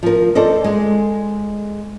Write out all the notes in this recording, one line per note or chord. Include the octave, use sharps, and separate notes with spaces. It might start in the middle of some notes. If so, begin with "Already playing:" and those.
F3 A#4
A4 C5 D5 D#5
G#3